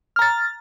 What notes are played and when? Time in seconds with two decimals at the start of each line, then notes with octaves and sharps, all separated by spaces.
0.16 F6
0.19 A#5
0.22 A6